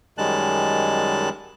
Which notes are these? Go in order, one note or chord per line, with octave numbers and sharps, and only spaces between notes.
F#2 D#3 G3 G#3 A5 F#6